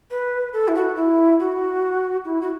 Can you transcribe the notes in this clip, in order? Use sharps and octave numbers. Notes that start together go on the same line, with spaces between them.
B4
A4
E4
F#4
E4
F#4
E4
F#4